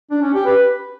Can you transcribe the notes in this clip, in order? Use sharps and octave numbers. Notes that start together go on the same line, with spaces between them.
D4
C#4
G4
B4